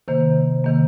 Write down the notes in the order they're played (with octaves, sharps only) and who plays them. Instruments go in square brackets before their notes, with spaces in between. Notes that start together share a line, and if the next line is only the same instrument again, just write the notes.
[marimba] C3 D#3 A#3 C5
C3 D#3 A#3